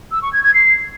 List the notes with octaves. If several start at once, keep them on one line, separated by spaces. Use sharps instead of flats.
E6
C#6
G#6
G#6
C7